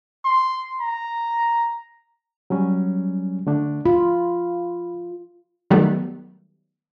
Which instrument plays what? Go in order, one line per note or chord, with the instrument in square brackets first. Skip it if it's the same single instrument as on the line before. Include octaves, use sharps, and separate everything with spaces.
[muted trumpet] C6
A#5
[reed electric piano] F#3 G3 C#4
D3 A3 D4
[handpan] F4 [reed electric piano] B5
[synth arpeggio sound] D#3 F#3 G3 A3 B3